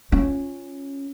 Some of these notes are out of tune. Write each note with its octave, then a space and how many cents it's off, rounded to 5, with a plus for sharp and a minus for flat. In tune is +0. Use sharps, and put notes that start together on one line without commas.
C#4 -5 F4 +0